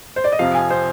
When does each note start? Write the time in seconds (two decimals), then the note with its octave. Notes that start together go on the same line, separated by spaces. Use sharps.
0.16 C5
0.24 D5
0.32 D#5
0.39 F2 C3 F3 F5
0.54 G#5
0.70 C5